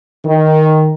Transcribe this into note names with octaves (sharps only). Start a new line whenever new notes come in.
D#3